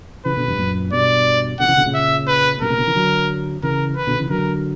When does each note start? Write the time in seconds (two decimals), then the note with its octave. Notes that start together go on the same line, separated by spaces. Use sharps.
0.25 C#3 E3 B4
0.37 B2 D3
0.48 E2 G2
0.59 F#2 A#2
0.92 G2 B2 D5
1.60 B2 D3 F#5
1.68 C#3 E3
1.77 B2 D3
1.86 A#2 C#3
1.94 E5
2.27 B4
2.61 G2 B2 A#4
2.70 A#2 C#3
2.78 B2 D3
2.86 C#3 E3
2.95 D3 F#3
3.63 C#3 E3 A#4
3.96 B4
4.07 B2 D3
4.19 C#3 E3
4.30 D3 F#3 A#4